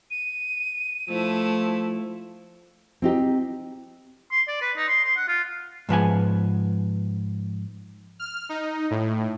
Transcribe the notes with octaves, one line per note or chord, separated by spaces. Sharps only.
D#7
F3 A3 E4
C4 D#4 G4
C6
D5
B4
D#4
C6
C6
F#5
F4
G#2 F3 B3 G#5
F6
D#4
A2